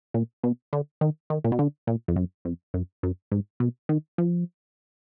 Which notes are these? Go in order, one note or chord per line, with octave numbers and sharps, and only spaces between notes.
A#2
B2
D3
D#3
D#3
A#2
B2
D3
A#2
F2
F#2
F2
F#2
F#2
G#2
B2
D#3
F3